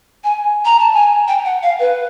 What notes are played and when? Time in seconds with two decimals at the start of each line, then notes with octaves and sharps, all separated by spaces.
0.24 G#5
0.65 A#5
0.80 A5
0.93 G#5
1.28 G5
1.45 F#5
1.63 F5
1.80 B4